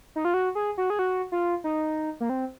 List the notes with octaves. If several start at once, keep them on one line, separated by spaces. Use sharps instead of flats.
D#4
F4
F#4
G#4
F#4
G#4
F#4
F4
D#4
A#3
C4